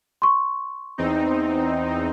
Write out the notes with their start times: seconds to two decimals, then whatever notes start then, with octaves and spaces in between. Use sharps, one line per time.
0.22 C6 C#6
0.98 E2 C4 D#4